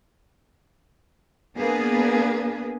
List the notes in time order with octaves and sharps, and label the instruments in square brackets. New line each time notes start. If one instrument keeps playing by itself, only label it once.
[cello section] A#3 B3 D4 G#4 B4